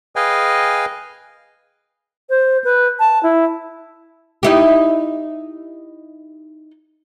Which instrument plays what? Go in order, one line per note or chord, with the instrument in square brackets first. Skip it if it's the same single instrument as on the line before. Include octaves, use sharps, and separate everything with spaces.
[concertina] G#4 B4 D#5 F5 G5 G#5
[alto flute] C5
B4
A5
E4
[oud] D#4 E4 G4